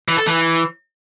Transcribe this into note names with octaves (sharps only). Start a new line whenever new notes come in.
E3
A4
E3